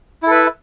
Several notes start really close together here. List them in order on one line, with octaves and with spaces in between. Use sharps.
E4 A4 B4 E5